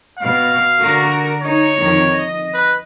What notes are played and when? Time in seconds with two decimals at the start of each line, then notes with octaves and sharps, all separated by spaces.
0.19 B2 F5
0.78 D3 F#4 A#4
1.42 D#4 C#5
1.78 F2 D#3
2.12 D#5
2.54 B4